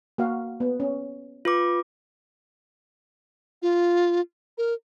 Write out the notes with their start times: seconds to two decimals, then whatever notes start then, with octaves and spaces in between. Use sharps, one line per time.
0.18 A#3 F#4 F5
0.60 B3
0.80 C#4
1.45 F4 B4 D6
3.62 F4
4.58 A#4